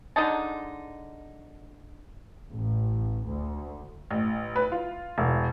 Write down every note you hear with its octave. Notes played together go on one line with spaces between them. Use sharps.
D3 G#3 D#4 A5
A1
D2
A1
B4
F4
E1